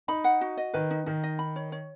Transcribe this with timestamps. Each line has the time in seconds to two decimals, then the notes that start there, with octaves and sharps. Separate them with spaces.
0.08 D#4 B5
0.24 F#5
0.41 F#4
0.57 D#5
0.74 D#3 B4
0.91 D#4
1.06 D#3 D#4
1.23 D#5
1.39 B5
1.56 C#5
1.72 C#5